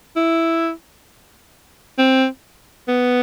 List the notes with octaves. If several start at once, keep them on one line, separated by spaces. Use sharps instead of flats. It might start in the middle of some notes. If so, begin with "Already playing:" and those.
E4
C4
B3